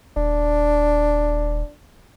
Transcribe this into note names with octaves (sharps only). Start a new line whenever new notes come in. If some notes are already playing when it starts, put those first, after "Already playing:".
D#1 D4